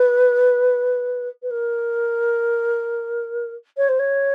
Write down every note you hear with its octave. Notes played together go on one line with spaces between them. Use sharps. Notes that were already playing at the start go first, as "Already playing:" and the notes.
Already playing: B4
B4
A#4
C#5
C5
C#5